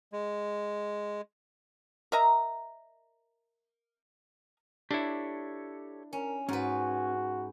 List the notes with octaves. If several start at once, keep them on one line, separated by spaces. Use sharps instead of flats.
G#3
A#4 D#5 E5 A#5
D4 E4 G4 A4 C#5
C#4 A#4
G#2 C#4 F#4 B4